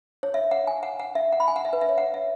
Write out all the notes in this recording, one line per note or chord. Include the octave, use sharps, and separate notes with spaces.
C#5
E5
F#5
G#5
F#5
F#5
E5
F#5
B5
G#5
F#5
E5
B4
E5
C#5
F#5
E5